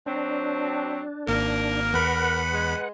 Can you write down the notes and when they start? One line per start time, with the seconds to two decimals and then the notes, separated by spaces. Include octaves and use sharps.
0.06 F#3 C4 D4
1.27 G#1 A#3 A#4
1.94 E2 B4 F#5 B5
2.52 G#3